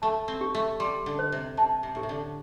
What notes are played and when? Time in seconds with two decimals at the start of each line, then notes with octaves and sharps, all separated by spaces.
0.02 A3 A5
0.28 C4
0.41 G4
0.55 A3
0.80 G3 C6
1.06 D3
1.19 C5
1.32 C3
1.57 C3 A5
1.83 C3
1.95 A2 G4
2.03 C3
2.09 D3